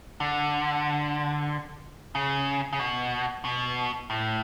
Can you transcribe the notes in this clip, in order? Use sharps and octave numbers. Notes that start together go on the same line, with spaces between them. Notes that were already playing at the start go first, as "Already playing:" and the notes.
D3
C#3
C#3
B2
B2
A2